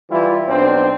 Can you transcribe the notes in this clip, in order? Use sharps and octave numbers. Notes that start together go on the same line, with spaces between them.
E3 G3 E4 F4
B1 C4 D4 C5